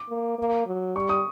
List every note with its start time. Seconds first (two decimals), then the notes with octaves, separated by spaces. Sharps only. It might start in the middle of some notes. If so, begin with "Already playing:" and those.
Already playing: D6
0.09 A#3
0.38 A#3
0.66 F#3
0.95 G3 C#6
1.09 D#6